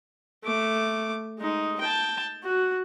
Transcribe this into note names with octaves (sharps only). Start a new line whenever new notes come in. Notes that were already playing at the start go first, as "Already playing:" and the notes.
A3 D6
G#3 D#4
G5 A5
F#4